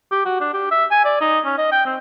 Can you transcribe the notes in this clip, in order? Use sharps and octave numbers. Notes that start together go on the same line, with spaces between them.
G4
F#4
D4
G4
E5
G#5
D5
D#4
C#4
D#5
G5
C4